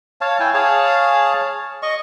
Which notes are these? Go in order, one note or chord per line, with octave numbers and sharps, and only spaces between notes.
C#5 F5 A5
E4 G5 G#5
G#4 C#5 F5 A5
D#5 C#6